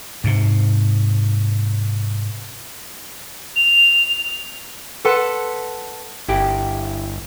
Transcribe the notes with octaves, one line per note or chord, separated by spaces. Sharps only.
G#2 C3
F7
A4 B4 F#5 A5 C6
G1 E4 G4